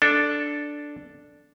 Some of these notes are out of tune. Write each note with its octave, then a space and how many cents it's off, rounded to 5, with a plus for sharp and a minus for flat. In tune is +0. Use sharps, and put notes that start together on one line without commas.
D4 +0 A4 +0